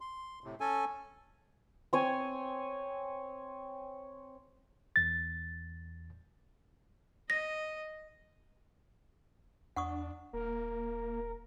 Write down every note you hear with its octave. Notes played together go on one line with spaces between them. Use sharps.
C6
A2 C3
C#4 A4 G#5
C4 C#5 G#5
E2 A6
D#5 A#6
E2 D4 F#5 C#6 D#6
D#1 A#3 A#4